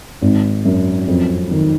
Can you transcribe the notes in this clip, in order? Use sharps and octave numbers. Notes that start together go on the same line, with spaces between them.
G#1
F#2
F2
D#3